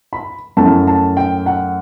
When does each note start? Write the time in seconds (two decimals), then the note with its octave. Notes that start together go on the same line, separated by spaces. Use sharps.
0.13 B5
0.57 F#2 F#3 A3 E4 A5
0.87 A5
1.17 G5
1.46 F#5